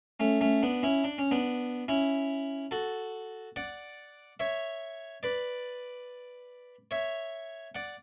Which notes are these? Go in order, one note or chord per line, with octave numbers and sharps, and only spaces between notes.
A3 C#4
A3 C#4
B3 D4
C#4 E4
D4
C#4
B3 D4
C#4 E4
F#4 A4
D5 F#5
C#5 E5
B4 D5
C#5 E5
D5 F#5